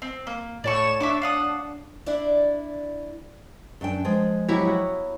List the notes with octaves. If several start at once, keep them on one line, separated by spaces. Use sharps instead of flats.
C4
A#3
A2 C#5 D5 A5 C#6 E7
D4 E5 C#6 D6
F5 F#5 D#6
D4 E4 D5
F#2 D4 G5
F3 G#3
F#3 E4 G4 C#5
B3 F#4